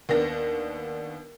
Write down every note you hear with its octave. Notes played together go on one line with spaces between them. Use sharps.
D#2 B3 D4 A#6